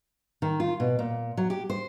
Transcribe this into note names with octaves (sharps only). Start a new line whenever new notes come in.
D#3
F4
B2
A#2
F#3
G4
C5